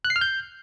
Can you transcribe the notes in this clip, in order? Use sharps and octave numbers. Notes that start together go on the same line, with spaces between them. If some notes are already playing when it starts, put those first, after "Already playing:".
F#6
C7
F6
G6